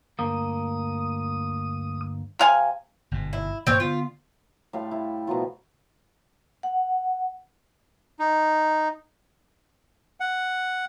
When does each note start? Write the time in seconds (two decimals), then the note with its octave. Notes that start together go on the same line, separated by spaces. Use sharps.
0.19 D2 G2 A#3 D#6
2.39 C3 F5 G#5
3.11 G1 G#2 B2
3.33 E4
3.67 G2 A#2 D#3 C4 C#5
3.80 D3 B3 F4
4.73 A2 G3 F5 C6
4.91 E4
5.27 B2 F3 F#3 F4
6.63 F#5
8.19 D#4
10.20 F#5